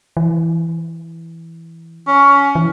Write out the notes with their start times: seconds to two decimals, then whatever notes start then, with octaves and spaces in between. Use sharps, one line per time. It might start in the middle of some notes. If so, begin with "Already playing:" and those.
0.17 E3
2.08 C#4
2.55 E3